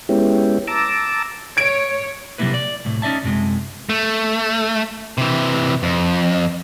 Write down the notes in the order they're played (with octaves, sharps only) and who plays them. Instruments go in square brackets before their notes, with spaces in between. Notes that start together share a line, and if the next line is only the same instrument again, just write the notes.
[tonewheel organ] G#3 B3 C#4 E4 G4
A5 A#5 D6 E6
[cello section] C#5 [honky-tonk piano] G#6 D7
[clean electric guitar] C3 F#3 G3 A#3 E4 B4
D5
C2 A2
C#4 D#4 D5 E5 A5
C2 F#2 C3 G#3
[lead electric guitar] A3
C3 E3
F2